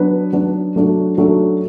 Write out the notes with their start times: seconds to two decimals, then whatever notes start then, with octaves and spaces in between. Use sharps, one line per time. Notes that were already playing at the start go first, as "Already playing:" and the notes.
Already playing: F#3 B3 D4 B4
0.33 F#3 B3 D4 B4
0.76 F#3 A3 D4 F#4
1.18 F#3 A3 D4 F#4